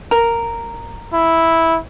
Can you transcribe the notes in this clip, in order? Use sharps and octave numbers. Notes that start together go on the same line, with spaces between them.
A#4
E4